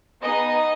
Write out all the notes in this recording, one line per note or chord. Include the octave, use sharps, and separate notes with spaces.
B3 D#4 G#4 D#5